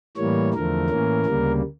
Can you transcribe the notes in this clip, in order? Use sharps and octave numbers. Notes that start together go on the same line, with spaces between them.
A2 E3 G3 A#3 C#5
E2 D3 F3 A3 A#4
A2 E3 A#3 C#4
D2 C#3 G3 A#3